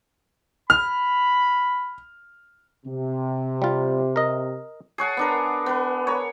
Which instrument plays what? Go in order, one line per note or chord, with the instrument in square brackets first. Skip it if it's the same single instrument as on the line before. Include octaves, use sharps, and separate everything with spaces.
[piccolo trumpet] B5 [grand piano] F6
[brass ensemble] C3
[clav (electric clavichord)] G3 F4
A#4 D#5
[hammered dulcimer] G#4 C#5 F#5 A5
B3 D4 A#4
B3 B4
A#4 C#5